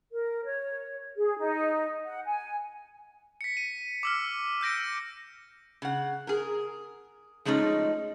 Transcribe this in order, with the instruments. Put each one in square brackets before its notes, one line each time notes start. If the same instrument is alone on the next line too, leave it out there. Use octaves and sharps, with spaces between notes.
[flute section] A#4
C#5
G#4
D#4
F#5
G#5
[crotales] B6 C#7
D#7
D6 E6 F6
E6 G6 A#6 D7
[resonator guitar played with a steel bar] C#3 F#5
G#4 A#4
F3 G#3 A3 C#4 D#4